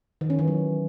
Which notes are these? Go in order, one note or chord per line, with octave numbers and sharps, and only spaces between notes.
D#3
C#4
E3
F#3